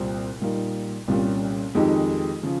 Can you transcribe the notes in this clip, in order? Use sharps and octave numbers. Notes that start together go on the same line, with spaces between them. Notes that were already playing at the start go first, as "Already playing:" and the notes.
Already playing: C2 A#2 G3 C4
A#2 G3 A#3 D#4
C2 A#2 G3 C#4 F4
F2 D#3 G#3 D#4 G4
C#3 F3